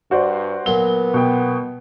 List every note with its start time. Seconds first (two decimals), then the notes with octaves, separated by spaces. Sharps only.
0.11 G2 F#4 C5 D5
0.66 A#2 F#3 B3 G7
1.14 B2 G5